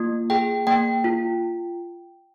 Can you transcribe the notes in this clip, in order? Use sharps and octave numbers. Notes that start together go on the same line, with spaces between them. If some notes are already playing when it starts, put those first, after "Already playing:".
Already playing: A#3 F4
G#4 G5
A#3 G5
F4